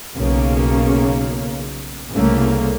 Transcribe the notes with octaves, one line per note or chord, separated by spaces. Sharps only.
B1 C#3 A#3
C2 C#3 A3 A#3